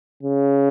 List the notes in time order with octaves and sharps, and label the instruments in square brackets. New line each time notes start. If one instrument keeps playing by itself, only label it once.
[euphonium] C#3